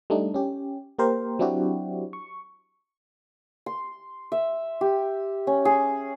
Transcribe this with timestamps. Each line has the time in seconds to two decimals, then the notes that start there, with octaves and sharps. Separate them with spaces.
0.10 G3 A3 D4 D#4
0.34 C#4 G4
0.99 A#3 G4 A#4 C5
1.39 F#3 C4 D4 E4 F#4 G4
2.13 C#6
3.66 C6
4.32 E5
4.81 G4
5.47 C#4
5.65 G#4